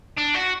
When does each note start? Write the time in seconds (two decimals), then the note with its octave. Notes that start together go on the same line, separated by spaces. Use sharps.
0.17 D4
0.34 F#4